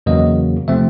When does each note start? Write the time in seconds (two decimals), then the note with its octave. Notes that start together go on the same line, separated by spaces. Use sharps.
0.06 E2 C#3 F#3 A#3 D#5
0.68 C3 F3 A3 C4 E5